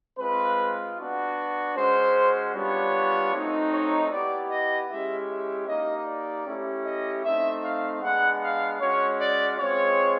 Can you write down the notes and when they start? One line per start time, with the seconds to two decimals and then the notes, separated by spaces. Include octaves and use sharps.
0.19 G#3 C4 F4 B4
0.98 B3 D4 F#4
1.75 G#3 C#4 F#4 C5
2.54 G3 B3 D4 F4 C#5
3.32 A3 C4 D#4 F#4
3.72 C#5
4.11 B3 E4 G4 D5
4.50 D#5
4.89 G#3 C#4 E4 G4 E5
5.28 E5
5.67 A#3 D#4 G4 D#5
6.06 D5
6.45 A3 C#4 E4 G4
6.85 D#5
7.23 A3 C4 D#4 E5
7.63 F5
8.02 G#3 B3 D4 F#5
8.42 F5
8.80 G#3 C#4 F#4 C#5
9.20 D5
9.58 G#3 C4 F4 C#5